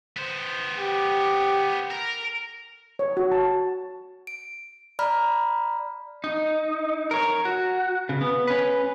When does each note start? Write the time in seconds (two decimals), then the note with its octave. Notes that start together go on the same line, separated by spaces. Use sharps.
0.17 B3 C5
0.78 G4
1.91 A#4
2.99 C#5
3.17 F#4
3.32 A5
3.45 A5
4.27 D7
4.99 D5 A#5 B5 F6
6.24 D#4
7.11 A#4 C#5
7.45 F#4
8.09 C#3
8.21 B3
8.47 C#4 B4